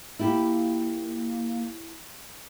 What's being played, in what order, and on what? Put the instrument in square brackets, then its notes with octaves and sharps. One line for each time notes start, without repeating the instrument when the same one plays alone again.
[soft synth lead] A#3 [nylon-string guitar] E4 F4 G4